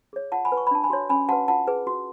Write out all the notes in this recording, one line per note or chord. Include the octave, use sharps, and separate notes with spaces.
G#4 C#5
F4 F#5 A5
G#5 B5
B4
C#6
B5
D4 A5
G#5 B5
F#4 C#5
C#4 G#5 B5
F#4 B4 F#5 A5
F4 F#5 A5
G#4 B4
F#4